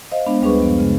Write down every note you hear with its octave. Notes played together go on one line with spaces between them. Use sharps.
C5 D#5 F5
G#3 B3 D4
D2 G3 D4 G#4 B4 C#6
F#2 F3 B3
C#3 G#3